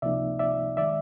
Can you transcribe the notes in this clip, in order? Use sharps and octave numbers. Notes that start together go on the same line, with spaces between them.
C#2 C3 F3 A#3 D#4 D5 E5
D5 E5
D#3 G#3 D5 E5